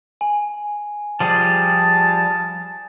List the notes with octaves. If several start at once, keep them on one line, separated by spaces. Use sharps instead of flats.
G#5
F3 G3 G#4 A5